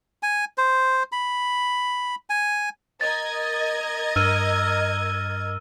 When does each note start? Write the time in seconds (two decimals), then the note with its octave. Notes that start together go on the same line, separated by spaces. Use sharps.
0.23 G#5
0.58 C5
1.12 B5
2.30 G#5
3.01 A#4 D#5 G#6 A6
4.16 G2 E6 F6 D#7